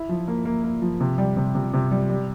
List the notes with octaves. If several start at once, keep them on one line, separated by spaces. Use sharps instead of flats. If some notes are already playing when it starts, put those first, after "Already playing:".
Already playing: E4
F3
A#3
A#3
A#3
F3
C3
G3
C3
C3
C3
G3
G3